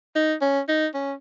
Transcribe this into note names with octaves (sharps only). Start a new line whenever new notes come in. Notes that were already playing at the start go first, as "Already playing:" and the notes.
D#4
C#4
D#4
C#4